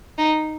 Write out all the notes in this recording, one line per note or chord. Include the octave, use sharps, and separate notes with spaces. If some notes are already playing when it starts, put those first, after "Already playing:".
D#4